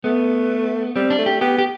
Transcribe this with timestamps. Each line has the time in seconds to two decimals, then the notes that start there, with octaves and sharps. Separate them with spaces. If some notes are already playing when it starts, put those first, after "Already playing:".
0.04 A3 B3
0.96 G3 C4
1.10 D4
1.18 A3
1.26 G4
1.41 B3 G4
1.58 G4